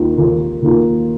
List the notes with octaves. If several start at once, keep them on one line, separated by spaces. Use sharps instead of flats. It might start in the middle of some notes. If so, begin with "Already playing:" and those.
Already playing: D#2 D#3 A#3 F4
D#2 D#3 A#3 F4
D#2 D#3 A#3 F4